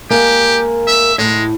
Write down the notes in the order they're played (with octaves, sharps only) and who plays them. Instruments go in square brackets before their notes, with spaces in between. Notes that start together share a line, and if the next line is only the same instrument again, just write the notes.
[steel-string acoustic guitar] G#3 A#3 A#4 [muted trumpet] G4
[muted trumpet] E5
[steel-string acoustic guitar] A2 [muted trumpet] G#3